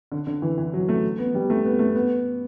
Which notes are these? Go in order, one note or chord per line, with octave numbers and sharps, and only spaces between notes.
D3
D3
E3
E3
F#3
A3
B3
G3
A3
B3
A3
B3